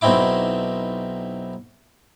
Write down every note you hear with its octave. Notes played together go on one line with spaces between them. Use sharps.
B1 B2 C4 D#4 E4 D6